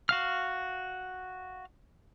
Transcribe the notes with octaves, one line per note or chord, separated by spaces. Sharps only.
F#4 F5 F6